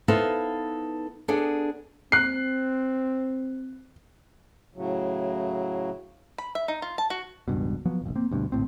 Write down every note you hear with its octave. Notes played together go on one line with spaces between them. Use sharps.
B3 D#4 E4 A4 C5 F5
B3 D4 G#4 A4
C4 F#6 C7
A2 C#3 F#3
B5
E5
D#4
F4
A5
F#4
E1 C#2 G2 B2
F3 F#3 B3
F1 A#1
A#3 C4
D2 G2 B2
G#1 C#2 A2 C4